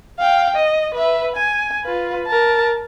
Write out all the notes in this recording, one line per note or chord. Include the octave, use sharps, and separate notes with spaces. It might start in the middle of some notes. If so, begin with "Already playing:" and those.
F5 G5
D#5
B4 E5
G#5
F4 B4
A#4 A5